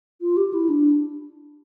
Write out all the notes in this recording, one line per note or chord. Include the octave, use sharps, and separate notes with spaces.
F4
G4
E4
D4